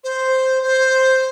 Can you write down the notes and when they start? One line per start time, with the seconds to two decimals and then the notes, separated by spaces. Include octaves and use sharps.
0.04 C5
0.63 C5